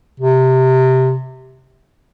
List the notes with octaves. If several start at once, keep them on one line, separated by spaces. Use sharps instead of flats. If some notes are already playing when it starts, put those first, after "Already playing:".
C3